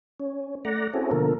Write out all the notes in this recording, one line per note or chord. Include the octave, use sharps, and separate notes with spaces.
C#4
A3 D5 F#5 A#5
C4 C#4 E4 F#4 G#4 A4
B2 D3 F3 A#3 A4 A#4